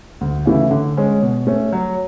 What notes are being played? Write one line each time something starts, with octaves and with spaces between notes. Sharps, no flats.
D2
C#3 E3 A3 E4
D3
G#3 C#4
B2
A3 C#4
F#3